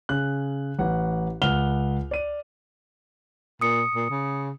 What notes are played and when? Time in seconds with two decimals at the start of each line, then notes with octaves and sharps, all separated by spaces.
0.09 C#3 F#6
0.79 A1 F#5
1.42 C#2 F#5 F6 F7 G7
2.11 D5 D#7
3.61 A#2 D#6 C#7
3.95 A#2
4.10 C#3